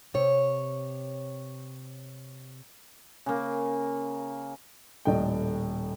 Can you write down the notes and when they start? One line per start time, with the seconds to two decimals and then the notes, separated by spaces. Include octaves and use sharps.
0.14 C3 C#5
3.26 C#3 A#3
5.05 D#1 A2 D5 D#5 G5